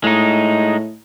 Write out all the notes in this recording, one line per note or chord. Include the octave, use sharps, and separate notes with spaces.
A2 G#3 D#4